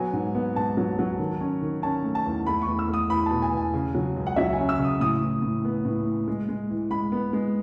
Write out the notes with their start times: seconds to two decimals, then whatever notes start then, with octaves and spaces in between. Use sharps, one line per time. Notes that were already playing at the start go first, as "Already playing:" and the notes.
Already playing: F#3 B3 G#5
0.13 G#2
0.35 B3
0.56 G#2 A5
0.77 F#3
0.99 F#3
1.19 D#3
1.41 C#4
1.62 D#3
1.82 C#4 A5
2.03 A3
2.15 A5
2.26 E2
2.46 A3 B5
2.62 C#6
2.67 E2
2.79 E6
2.88 A3
2.93 D#6
3.10 E2 B5
3.26 B2 A5
3.42 G#5
3.53 E2 G#5
3.74 C#3
3.95 F#3
4.16 C#2
4.27 F#5
4.36 F#3 E5
4.53 G#5
4.58 C#4
4.69 E6
4.79 C#3
4.84 D#6
5.00 A2 D#6
5.22 E3
5.42 A2
5.65 B3
5.85 A2
6.06 E3
6.28 G#3
6.49 G#3
6.70 E3
6.91 G#3 B5
7.12 B3
7.33 G#3